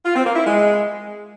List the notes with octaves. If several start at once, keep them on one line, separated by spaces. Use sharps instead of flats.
F4
C4
A#3
E4
G#3